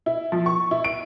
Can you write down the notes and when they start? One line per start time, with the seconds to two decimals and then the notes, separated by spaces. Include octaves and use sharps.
0.06 E4
0.32 F3
0.46 C#6
0.71 E4
0.84 D7